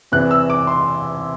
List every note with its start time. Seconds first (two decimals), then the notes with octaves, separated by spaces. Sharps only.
0.12 E2 C3 E3 F#6
0.31 E6
0.50 D6
0.67 C6